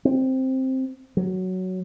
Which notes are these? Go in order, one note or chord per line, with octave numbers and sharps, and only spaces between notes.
C4
F#3